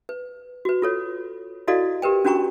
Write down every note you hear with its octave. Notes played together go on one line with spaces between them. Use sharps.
B4
F#4 B4
F4 A4 C#5
E4 F#4 A4 D5 D#5 F5
G4 A#4 B4 G5
C#4 D4 F#4 G5 A#5 C#6